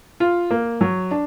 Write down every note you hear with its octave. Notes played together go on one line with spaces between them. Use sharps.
F4
A#3
F#3
D4